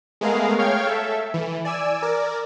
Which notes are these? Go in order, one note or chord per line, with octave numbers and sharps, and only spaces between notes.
G#3 A3 B3 G#4 A#4 F5
C#5 F5 G5 F6 G#6
A4 E5
E3
D5 G#5 E6
A#4 D5